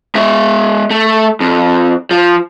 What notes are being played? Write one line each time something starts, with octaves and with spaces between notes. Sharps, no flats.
G#3 E5
A3
F2
F3